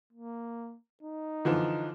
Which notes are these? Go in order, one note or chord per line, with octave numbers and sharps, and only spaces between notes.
A#3
D#4
D3 E3 F3